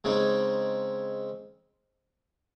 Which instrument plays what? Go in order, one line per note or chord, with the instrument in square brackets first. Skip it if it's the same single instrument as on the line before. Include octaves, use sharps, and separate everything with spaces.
[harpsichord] C#3 G#3 C4 D#4 G#4